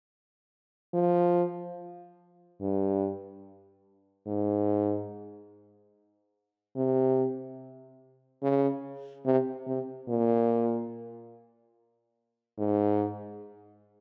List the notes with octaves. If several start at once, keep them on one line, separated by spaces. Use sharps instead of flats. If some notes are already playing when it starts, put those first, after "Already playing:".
F3
G2
G#2
C3
C#3
C3
C3
A#2
G#2